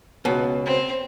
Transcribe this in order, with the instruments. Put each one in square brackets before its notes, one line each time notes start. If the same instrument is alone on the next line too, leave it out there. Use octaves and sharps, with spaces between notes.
[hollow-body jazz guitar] C#2 B2
[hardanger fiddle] C4